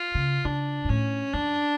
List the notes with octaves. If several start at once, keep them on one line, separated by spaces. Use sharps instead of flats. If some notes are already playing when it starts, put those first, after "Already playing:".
Already playing: F4
C#3
C#3 D4
G#2
A2 C#4
F#2 D4